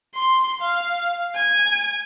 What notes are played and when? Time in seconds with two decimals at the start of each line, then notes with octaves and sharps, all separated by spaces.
0.15 C6
0.62 F5
1.36 G#5